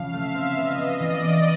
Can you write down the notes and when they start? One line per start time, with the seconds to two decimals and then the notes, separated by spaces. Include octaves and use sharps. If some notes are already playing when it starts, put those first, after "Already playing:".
Already playing: C#3 F3 F5
0.13 A3 E5
0.35 C4
0.56 B3 D#5
0.78 B3
1.00 E3 D5
1.22 B3